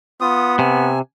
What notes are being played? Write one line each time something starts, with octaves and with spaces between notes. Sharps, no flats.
B3 F4 D#6
C3 G#5